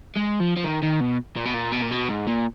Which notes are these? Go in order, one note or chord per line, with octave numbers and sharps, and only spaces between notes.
G#3
F3
F3
D#3
D#3
B2
A#2
B2
A#2
B2
A#2
B2
G#2
A#2